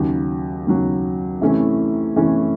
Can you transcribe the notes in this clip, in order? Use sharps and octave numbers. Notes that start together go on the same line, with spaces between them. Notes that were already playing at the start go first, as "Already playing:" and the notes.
Already playing: D#2 C#3 F#3
D#2 C#3 F#3
C3 E3 A3 C#4 E4
C3 E3 A3 C#4 E4